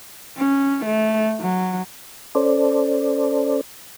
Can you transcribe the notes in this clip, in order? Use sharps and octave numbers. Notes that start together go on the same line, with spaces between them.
C#4
A3
F#3
C#4 A4 C5 D5